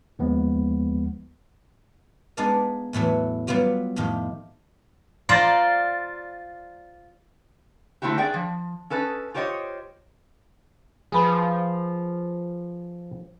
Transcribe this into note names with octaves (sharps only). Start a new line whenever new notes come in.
D#2 F3 G#3 B3
G#3 B3 D4 D#4 D5 F5
E2 A2 E3 F#3
F#3 G3 B3 F4 G4
F2 A2 D#3 G4
F4 C5 D5 A#5
D3 A3 C4 E4 F#4 G4
D4 G#4 D5 G5
F3
C#4 A4 B4 D#5
F4 G4 C5 C#5 D#5
F3 G#4 B4